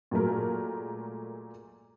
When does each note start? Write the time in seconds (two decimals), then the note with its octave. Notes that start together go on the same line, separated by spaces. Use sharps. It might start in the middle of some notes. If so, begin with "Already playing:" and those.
0.11 A#2 F#3 G#3 A3 A#4